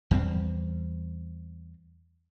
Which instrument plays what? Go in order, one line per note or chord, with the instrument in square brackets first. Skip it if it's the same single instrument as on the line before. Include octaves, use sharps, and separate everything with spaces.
[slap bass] E2 G3 C4